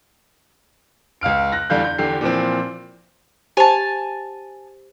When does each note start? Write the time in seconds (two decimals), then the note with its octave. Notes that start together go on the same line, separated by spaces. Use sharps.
1.21 C#2 F5 F6 D7
1.52 F#6 A#6
1.70 E2 D3 G3 F5 G6
1.84 G6
1.98 E2 D3 G4 C7
2.21 A#2 E3 F3 C4
3.57 G4 C5 G#5 A5 F7